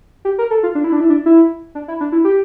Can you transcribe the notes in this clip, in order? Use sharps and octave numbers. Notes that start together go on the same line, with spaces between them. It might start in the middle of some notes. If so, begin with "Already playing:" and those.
G4
A#4
A4
F4
D4
E4
D4
E4
D4
E4
D4
E4
D4
E4
G4